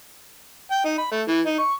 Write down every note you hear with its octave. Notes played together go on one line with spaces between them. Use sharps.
G5
D#4
B5
A3
E3
D#4
C#6